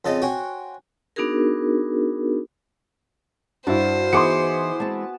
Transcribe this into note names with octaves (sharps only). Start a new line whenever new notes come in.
F2 C#3 A4 C5 D#5 D#6
F#4 C5 C#5 G5 G#5
B3 D4 D#4 F#4 G#4 A#4
G2 E4 F#4 C5 D5
E3 B3 D#4 G#4 B4 C6 D6 C#7
G#3 C4 A5